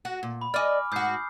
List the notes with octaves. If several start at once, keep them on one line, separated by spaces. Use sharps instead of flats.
F#4
A#2
B5
D5 D#5 G#5 D6 F6
G#2 F#4 D#6 G6 C7